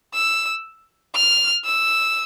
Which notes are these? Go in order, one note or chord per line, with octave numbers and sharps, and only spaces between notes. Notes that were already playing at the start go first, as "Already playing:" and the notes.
E6
F6
E6